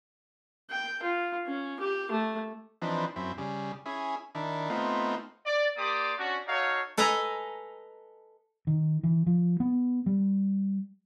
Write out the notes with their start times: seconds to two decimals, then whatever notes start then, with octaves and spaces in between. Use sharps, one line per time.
0.70 G5
1.03 F4
1.46 C#4
1.80 G4
2.11 A3
2.82 E3 F3 C4 D4 D#4 B4
3.16 F#2 C4 E4
3.38 C#3 G3
3.86 C#4 E4 G#4
4.35 D#3 D4 E4
4.69 A3 B3 C4 D#4 F4
5.45 D5
5.77 A#3 G4 D5 C6 D6 D#6
6.18 C#4 D4 F#4
6.47 D#4 F#4 A4 C#5 F5
6.98 A4 B4 D#5 G#5 A#5
8.67 D#3
9.04 E3
9.26 F3
9.60 B3
10.06 G3